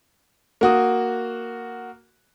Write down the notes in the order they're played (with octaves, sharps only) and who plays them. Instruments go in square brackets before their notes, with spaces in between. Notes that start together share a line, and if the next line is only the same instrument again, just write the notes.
[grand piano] A#3 F#4 D#6